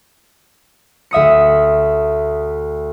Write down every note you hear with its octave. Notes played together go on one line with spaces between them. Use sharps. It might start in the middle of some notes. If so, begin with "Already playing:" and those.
D2 E5 D#6 C#7